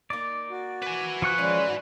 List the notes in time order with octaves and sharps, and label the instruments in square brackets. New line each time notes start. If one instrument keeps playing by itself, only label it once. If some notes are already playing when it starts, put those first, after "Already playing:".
[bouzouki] A#3 D#4 [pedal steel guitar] D5
[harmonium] F#4
[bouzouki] A#3 [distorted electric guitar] B4 G#5
[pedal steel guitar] F3 C#6 F#6
[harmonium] G#3 C#4 [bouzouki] D5 E5
[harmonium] G#2 F#4